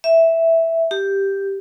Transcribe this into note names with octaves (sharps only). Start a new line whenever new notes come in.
E5
G4